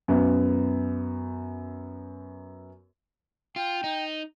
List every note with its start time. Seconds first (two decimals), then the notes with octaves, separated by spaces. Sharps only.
0.08 F#2 B3
3.56 F4 G5
3.84 D#4